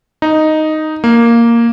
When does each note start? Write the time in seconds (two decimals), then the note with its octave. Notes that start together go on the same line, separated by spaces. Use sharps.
0.22 D#4
1.04 A#3